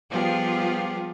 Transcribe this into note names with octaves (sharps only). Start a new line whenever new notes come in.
F3 G3 B3 F4 G4 G#4